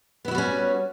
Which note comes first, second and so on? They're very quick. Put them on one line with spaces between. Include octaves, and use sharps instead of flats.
B3 E4 F#4 G3 C#4